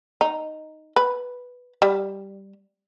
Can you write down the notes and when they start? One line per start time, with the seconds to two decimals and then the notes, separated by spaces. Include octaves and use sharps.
0.21 D#4
0.96 B4
1.82 G3